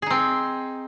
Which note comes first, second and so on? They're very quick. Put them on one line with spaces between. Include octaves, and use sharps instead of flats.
G#4 D#4 C4